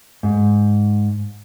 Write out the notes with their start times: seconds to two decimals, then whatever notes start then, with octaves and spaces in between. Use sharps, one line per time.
0.23 G#2